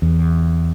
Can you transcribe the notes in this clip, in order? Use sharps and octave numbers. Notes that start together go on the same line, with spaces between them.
E2